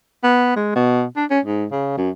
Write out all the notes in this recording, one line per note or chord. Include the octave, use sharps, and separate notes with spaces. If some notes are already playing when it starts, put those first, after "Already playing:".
B3
G#3
B2
D4
C#4
G#2
C#3
F#2